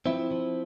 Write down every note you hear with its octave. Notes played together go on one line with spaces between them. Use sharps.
F3 C4 E4
F3